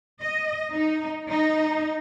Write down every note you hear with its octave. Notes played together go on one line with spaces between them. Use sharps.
D#5
D#4
D#4